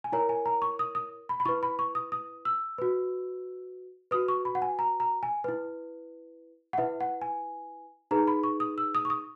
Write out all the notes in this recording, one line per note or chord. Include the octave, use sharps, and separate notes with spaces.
G#5
E4 A#4 C#5 A#5
G#5
A#5
C#6
D#6
D#6
B5
B5
E4 B4 C#6
B5
C#6
D#6
D#6
E6
F#4 B4
F#4 B4 D#6
C#6
B5
F#5
G#5
A#5
A#5
G#5
E4 B4
F#5
E4 B4 E5
F#5
G#5
D#4 G#4 B4 A#5
B5
C#6
D#6
E6
D#6
C#6
D#6